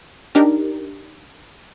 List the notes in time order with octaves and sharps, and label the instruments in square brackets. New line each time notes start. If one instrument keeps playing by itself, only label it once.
[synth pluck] D4 D#4 G4 A#4